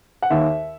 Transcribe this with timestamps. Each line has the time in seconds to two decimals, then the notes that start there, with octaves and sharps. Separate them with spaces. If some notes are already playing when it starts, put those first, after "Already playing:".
0.22 F#5
0.30 D#2 E5